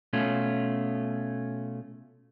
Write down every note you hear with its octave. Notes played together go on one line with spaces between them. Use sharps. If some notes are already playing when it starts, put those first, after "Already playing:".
B2 A3 C#4 F4